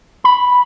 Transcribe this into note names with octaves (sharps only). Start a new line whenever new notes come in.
B5